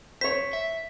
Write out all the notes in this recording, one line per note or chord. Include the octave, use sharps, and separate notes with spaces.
C5 C#5 B6
E5